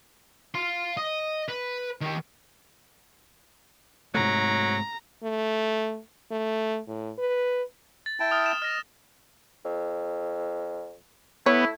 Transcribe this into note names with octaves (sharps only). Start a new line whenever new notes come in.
F5 C6
D#5
B4
D#3 G4
G#2 C3 F#3 A3 A#5
A3
A3
A2
B4
A6
E4 G5 A5
D#6 F6
E7
D#5 F6 A#6
F2
A3 B3 E4 C#5